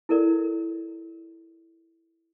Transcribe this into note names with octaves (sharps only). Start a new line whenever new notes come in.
E4 A4 A#4 D5